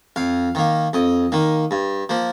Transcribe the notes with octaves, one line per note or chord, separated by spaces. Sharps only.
F2 F5
D#3 A#3
F2 D#5
D#3 A#3
G2
F3 A#3